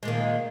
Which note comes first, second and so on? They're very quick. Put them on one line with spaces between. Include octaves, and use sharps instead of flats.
G#3 A#2 D#3